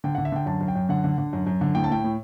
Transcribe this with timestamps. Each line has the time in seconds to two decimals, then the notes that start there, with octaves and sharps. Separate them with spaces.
0.04 D3 G5
0.15 F#5
0.18 D3
0.25 E5
0.32 D3 G5
0.46 F#2 A5
0.61 F#2
0.68 G5
0.75 F#2
0.89 D3 F#5
1.04 D3
1.18 D3
1.33 F#2
1.47 F#2
1.61 D3
1.75 A2 G5
1.84 A5
1.90 A2 G5
2.04 A2